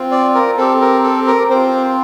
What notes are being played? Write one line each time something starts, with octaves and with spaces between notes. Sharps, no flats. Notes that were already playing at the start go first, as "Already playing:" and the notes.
Already playing: C4 F4
D5
A#4
C4 G4 A4
A#4
A4
A#4
C4 F4 C5